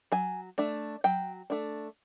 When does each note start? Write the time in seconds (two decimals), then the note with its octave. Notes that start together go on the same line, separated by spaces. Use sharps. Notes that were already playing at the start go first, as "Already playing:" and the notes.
0.12 F#3 G#5
0.58 A3 D4
1.04 F#3 G5
1.50 A3 D4